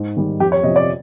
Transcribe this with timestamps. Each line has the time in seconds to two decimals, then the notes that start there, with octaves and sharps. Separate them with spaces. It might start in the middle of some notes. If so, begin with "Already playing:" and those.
Already playing: G#2
0.17 D#3 G3
0.40 F2 G4
0.52 C#5
0.63 C3 F3 D#5
0.76 D5